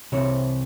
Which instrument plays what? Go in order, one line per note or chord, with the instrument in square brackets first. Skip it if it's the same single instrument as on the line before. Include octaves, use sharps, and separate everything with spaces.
[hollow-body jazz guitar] C2 C3 E3 C4 C#5